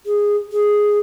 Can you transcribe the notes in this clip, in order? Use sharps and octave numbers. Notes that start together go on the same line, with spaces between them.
G#4
G#4